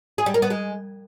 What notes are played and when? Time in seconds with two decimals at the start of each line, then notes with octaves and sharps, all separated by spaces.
0.18 G#4
0.26 G3
0.34 A#4
0.42 B3
0.50 G#3